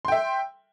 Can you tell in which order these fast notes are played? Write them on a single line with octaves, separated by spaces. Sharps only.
C6 G5 E5